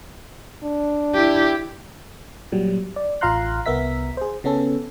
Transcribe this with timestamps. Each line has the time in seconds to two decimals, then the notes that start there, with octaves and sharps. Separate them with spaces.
0.64 D4
1.15 E4 G4
2.52 A#2 F#3 G3
2.96 D5
3.21 A1 F4 F5 A#5 C6 F#6
3.66 C2 B3 A#4 E5 B6
4.17 G#4 C5
4.44 C#3 B3 C#4 A4